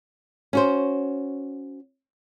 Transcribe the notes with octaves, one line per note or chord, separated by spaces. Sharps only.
C#4 F#4 C5